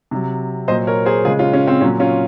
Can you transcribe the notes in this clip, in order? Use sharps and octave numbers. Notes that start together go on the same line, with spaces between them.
C3 F#3
A#2 F#3 C5 D#5
A#4 C#5
G#4 C5
C#3 G#3 F4 G#4
C#4 F4
C#4
C4
A#2 F#3 C#4
C#4 F4